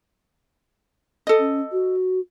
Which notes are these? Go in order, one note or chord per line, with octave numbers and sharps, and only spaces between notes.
A4 D#5
C#4
F#4